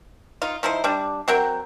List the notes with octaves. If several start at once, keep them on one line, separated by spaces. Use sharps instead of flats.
D#4 F4
F3 D#4 E4 C5
G3 D4
F#3 C4 A#4 G5